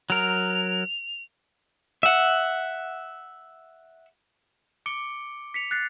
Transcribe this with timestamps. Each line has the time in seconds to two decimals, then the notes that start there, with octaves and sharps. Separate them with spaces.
0.10 F#3 A#4 F7
2.03 E5 F#5
4.86 D6 C#7 D7 G7
5.54 B6 C#7 F7
5.71 F#6 A6 C7